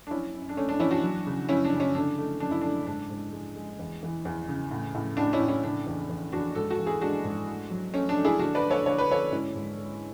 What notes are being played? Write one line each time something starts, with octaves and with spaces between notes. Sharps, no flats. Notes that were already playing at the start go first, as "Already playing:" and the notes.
D4
F#2 C#4 E4
F#2
D4
A3 C#4
D4
E3 C#4 E4
D4 F#4
F#3
C#3
F#2 C#4 E4
D4
C#3
C#4
D3 D4
A3
F#2 D4
E4
A3 D4
G#2 D4
G#2
G#3
G#3
E2
E3
E2
C#3
A2
A2
A2 D4
C#4 E4
A2
C#4 E4
C#3 D4
E2
E2
E2 D4 F#4
G#2 F#4 A4
F#4 A4
E3
E4 G#4
G#3 D4 F#4
G#2
A3
F#3
A3 C#4
D4
A3
E4 G#4
D3 D4 F#4
B4 D5
A3
A4 C#5
D3 C#5
B4
D3 A4 C#5
G#2 C#4 E4
G#2
G#3